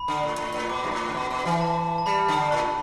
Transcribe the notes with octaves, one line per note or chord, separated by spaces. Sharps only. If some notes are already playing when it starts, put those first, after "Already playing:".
Already playing: B5
D3
A2
A2
A2
B2 D6
G2
A2
D3
B2
B2
E3
A5
A5
G3 B5
D3
A2